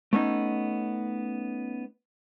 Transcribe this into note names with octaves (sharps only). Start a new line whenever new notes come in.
A3 B3 C#4 D#4